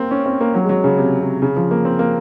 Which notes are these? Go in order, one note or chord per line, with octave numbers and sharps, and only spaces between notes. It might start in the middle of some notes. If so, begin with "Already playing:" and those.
Already playing: A#3 C4
C#4
C4
A#3
F#3
G#3
F#3
C#3
C3
C3
C#3
F3
A#3
C4
A#3